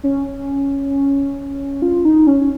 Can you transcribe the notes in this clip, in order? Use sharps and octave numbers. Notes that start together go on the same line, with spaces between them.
C#4
F4
D#4
C#4